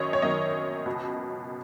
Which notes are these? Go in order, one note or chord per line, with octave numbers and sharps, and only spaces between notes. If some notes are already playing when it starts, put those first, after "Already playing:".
Already playing: F#2 D#3 C#5 D#5
C#5
F#2 D#3 D#5
C#2 B2